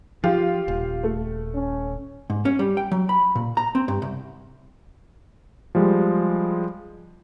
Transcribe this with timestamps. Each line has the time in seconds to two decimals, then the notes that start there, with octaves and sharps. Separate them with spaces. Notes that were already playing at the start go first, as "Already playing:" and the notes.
0.24 F3 F4 G4
0.68 D#1
1.04 A3
1.55 C#4
2.30 G#2
2.45 C#4
2.59 G3
2.77 G5
2.92 F#3
3.09 B5
3.35 A#2
3.57 A#5
3.75 C4
3.88 G2
4.02 C2
5.75 F3 G3 G#3